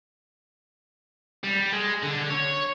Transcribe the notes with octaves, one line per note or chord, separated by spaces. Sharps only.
G3
G#3
D3
C#5